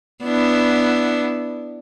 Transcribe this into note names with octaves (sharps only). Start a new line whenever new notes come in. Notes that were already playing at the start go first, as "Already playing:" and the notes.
B3 D4 E4